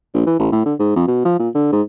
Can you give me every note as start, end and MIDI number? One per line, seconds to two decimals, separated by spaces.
0.14 0.22 34
0.26 0.37 52
0.39 0.47 33
0.52 0.63 45
0.66 0.74 50
0.79 0.92 44
0.96 1.08 41
1.08 1.25 47
1.25 1.38 53
1.39 1.49 46
1.55 1.68 50
1.72 1.82 44